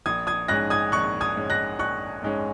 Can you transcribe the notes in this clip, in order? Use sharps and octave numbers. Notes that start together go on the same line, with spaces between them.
A#1 D#6 G#6
D#6 G#6
G#2 G#3 C#4 F#6 A#6
D#6 G#6
A#1 C#6 F#6
D#6 G#6
G#2 G#3 C#4
F#6 A#6
A#1 C#6 F#6
G#2 G#3 C#4